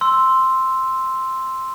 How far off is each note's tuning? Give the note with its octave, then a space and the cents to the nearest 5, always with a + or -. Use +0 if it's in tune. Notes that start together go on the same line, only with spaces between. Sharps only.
C6 +0 E6 +0